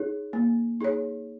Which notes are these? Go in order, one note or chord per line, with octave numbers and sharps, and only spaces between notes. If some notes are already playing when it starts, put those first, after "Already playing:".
Already playing: D#4 G#4 C#5
A#3
D#4 G#4 C#5